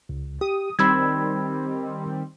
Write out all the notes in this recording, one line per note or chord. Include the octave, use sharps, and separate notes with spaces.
C#2
G4 D#6
D#3 G3 C4 B5 E6 G#6